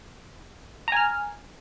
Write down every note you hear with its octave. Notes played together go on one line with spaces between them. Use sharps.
G#5 A#5 F6